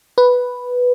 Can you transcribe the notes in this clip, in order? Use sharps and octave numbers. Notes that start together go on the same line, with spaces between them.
B4